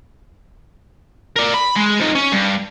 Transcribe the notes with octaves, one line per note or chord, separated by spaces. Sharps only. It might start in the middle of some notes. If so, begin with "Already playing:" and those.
A#4 D5
B5
G#3
F3 D#4
C#4
G2